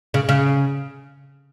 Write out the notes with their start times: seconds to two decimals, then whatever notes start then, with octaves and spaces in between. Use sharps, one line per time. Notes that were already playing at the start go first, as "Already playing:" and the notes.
0.14 C#3
0.29 C#3